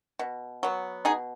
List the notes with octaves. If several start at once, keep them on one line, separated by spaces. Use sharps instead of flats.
B2
F#3 B3
B2 D#4 G#4